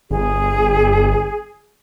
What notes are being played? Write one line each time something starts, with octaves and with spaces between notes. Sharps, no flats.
G1 G#4